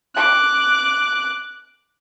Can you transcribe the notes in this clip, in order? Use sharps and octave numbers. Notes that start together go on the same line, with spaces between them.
D6 F#6